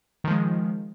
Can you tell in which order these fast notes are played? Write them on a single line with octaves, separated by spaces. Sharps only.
D#3 F3 G#3